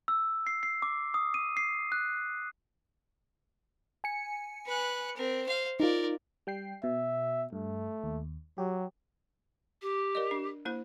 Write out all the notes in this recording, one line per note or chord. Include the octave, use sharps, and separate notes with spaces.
E6
C7
C7
D6
D#6
D#7
C7
F#6
G#5 C#7
B4 F#6
C4 A#4
C5 F5
D#4 F4 A#4 D5
G3 G5 C7
B2 E5
G2 A3
D#2
F#3 G4
G4
A#4 D5 D#5
D4
A#3 E4 C5